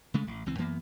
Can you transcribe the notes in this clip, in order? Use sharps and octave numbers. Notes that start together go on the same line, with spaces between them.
C#3 G#3 A3
A1
C#2 E3 C4
F#2 E3 A#3 B3